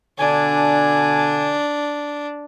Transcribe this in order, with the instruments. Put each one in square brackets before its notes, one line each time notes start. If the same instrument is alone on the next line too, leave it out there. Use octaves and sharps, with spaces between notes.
[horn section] B2 D3 G#5 [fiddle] D4